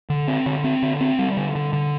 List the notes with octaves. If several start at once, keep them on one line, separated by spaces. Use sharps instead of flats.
D3
C4
D3
C4
D3
C4
G3
D3
D3
D3